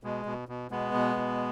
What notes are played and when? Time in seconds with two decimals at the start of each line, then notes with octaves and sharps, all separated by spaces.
0.03 B2 G#3
0.26 B2
0.48 B2
0.71 B2 G#3 B3
0.94 B2
1.16 B2